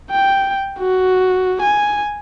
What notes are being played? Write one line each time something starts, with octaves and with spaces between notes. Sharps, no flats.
G5
F#4
G#5